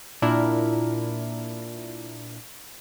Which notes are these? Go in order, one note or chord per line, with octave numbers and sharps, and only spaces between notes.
A#2 D4 E4 A#4